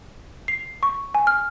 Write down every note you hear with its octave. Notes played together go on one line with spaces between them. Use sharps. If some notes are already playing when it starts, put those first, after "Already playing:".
C7
C#6
G#5
F6